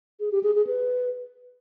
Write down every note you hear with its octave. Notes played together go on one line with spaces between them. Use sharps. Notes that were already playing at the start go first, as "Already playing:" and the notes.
G#4
G4
G#4
G#4
B4